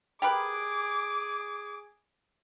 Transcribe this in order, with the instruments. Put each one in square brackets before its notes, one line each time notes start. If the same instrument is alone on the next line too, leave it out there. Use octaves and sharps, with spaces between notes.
[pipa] G4 A#4 B4 [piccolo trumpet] G#4 [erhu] D6